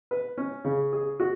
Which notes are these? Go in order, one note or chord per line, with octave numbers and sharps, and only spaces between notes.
B4
C#4
C#3
G#4
F#4